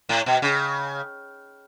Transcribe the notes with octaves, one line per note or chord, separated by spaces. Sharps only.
A2
B2
C#3